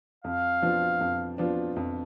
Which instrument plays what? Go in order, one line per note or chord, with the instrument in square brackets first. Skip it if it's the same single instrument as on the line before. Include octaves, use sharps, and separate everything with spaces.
[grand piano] F2 [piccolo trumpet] F5
[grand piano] F3 B3 D4 F4
F2
F3 B3 D4 F4
F2